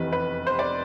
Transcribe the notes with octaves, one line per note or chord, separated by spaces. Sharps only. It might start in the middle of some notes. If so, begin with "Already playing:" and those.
Already playing: F1 E2 C3 E3 B4
B4
C5
D5